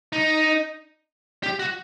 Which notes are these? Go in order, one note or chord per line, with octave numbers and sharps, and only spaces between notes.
D#4
G4
F#4